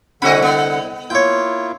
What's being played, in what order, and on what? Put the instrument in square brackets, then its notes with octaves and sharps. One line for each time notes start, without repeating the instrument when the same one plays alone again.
[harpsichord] C2 B5 [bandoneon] D3 F#5 [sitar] C4 F#4 D#5
[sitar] B3
[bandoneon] A#3 E4 F4 [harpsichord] C#5 G5